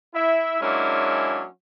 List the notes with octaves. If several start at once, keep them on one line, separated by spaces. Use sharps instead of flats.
E4 E5
F#3 G#3 A#3 C#4 D4 E4